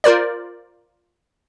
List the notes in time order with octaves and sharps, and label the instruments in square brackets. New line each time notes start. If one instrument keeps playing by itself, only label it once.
[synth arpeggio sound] F4 A#4 C5 D5